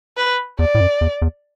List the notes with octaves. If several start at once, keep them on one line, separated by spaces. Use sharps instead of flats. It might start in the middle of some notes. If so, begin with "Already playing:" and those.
B4
E2 D5
A2
F#2
E2
E2